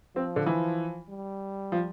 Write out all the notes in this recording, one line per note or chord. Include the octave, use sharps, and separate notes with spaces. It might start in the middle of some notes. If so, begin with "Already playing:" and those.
F3 C4
D3
E3
G3
F3